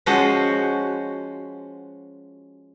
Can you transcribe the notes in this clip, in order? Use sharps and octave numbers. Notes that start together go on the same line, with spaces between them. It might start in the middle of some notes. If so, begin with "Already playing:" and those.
F3 G#3 C#4 F#4 C5